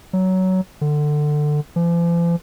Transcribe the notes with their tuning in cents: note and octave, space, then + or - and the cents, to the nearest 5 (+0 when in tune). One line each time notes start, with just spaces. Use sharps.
F#3 +15
D3 +20
F3 -45